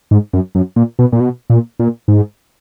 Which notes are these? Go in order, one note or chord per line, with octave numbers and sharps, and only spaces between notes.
G#2
F#2
F#2
A#2
B2
A#2
B2
A#2
A#2
G#2